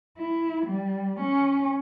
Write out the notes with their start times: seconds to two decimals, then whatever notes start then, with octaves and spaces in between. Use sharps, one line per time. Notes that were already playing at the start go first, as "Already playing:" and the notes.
0.17 E4
0.66 G3
1.20 C#4